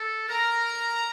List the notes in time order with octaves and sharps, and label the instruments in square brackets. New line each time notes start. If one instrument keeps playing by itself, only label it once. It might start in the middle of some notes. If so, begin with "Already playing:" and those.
Already playing: [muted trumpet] A4
[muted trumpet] A#4 [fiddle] A#5